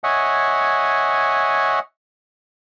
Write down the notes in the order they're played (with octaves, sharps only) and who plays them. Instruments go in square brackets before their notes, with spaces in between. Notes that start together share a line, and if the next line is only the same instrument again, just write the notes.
[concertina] C#5 D#5 E5 F#5 G#5